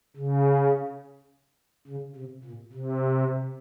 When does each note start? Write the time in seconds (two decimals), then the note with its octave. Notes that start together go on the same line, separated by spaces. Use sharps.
0.16 C#3
1.87 C#3
2.16 C3
2.44 A#2
2.73 C3